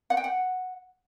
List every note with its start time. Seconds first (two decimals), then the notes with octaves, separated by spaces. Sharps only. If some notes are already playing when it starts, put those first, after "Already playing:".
0.10 F#5
0.17 G5
0.24 F#5